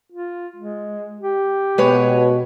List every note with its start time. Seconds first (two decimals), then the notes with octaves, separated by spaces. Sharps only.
0.13 F4
0.56 G#3
1.21 G4
1.78 B2 G#3 B4 C#5